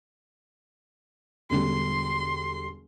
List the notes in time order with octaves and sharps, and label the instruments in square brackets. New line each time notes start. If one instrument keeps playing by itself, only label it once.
[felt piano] E1 D3 G3 [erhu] C6